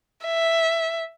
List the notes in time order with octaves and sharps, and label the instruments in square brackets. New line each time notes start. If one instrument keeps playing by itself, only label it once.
[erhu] E5